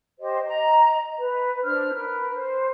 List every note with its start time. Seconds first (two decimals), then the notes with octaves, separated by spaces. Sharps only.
0.19 G4 C5 D#5
0.45 D#5 A#5
1.17 B4
1.63 D4 C5 F6
1.93 A#4 B4
2.33 C5